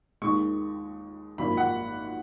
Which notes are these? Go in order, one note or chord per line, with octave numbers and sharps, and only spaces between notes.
D#2 D#3 G#3 C#6
G#1 F#2 F3 A#3 B5
F#5